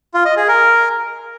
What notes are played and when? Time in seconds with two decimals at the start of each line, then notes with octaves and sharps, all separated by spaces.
0.14 F4
0.25 D#5
0.37 G#4
0.48 A#4